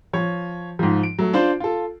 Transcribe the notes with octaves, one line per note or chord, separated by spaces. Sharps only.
F3 C#5
G#2 F3
D7
F#3 A3
D4 F4 C5
F4 A4